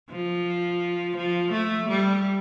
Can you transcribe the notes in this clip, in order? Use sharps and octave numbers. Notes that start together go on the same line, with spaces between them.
F3
F3
A3
G3